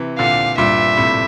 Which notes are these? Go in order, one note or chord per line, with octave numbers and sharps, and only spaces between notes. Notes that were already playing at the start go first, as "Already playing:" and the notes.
Already playing: C3 E3
A#2 D3 F5
G2 A#2 E5
A2 C3